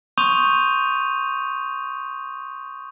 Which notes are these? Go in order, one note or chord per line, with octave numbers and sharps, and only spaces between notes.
C6 C#6 D#6 G6 D#7 F7